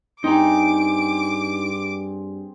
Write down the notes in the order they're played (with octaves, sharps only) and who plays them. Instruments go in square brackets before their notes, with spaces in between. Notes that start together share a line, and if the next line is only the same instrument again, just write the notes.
[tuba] G2 [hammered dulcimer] C4 G#4 [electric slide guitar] D#4 A#5 [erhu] D6